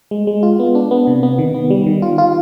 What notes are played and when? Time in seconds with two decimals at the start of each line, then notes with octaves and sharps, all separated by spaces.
0.11 G#3
0.27 G#3
0.43 F4
0.59 B3
0.75 D4
0.91 B3
1.07 C3
1.23 B3
1.38 D#3
1.54 B3
1.70 G3
1.86 D#3
2.02 F4
2.18 F4